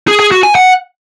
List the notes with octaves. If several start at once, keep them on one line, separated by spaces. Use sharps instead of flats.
G#4
G#4
F#4
G#5
F#5